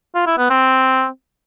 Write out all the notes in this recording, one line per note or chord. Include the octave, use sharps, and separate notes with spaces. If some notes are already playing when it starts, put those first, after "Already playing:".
F4
E4
B3
C4